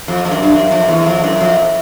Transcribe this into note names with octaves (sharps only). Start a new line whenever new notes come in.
F2
F2
F#2
G2
F#2
F2
E2
F2
F#2
F2